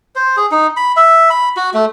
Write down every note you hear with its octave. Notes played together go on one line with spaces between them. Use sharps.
C5
G#4
D#4
B5
E5
B5
F#4
A3